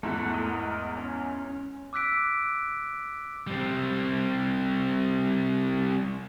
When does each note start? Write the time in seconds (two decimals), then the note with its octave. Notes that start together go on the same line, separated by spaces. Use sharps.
0.03 E2 G#2 A3 E4 F#5
0.34 A#4 D#5
0.97 C#4
1.93 D6 E6 F#6 B6 D7
3.47 G3 C4